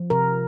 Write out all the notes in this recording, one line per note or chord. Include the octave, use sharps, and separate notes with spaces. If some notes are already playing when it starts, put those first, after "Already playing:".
Already playing: F3
C3 A#4